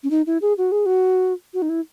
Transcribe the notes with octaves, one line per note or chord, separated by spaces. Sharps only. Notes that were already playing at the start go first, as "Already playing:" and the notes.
C#4
D#4
E4
G#4
F#4
G#4
F#4
F#4
D#4
E4